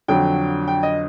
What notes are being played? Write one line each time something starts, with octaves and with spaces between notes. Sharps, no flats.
F2 D3 F#3 G5
G5
D#5